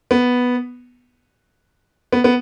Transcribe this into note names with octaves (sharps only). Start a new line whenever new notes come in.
B3
B3
B3